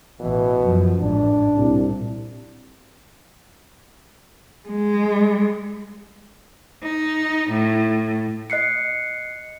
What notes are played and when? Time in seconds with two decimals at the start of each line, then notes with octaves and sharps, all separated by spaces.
0.20 A1 B2 E3
0.61 F#2 F3
1.00 A1 G#2 D4
1.56 C2 A#2
4.69 G#3
6.83 D#4
7.50 A2
8.50 D#5 F#6 C7 C#7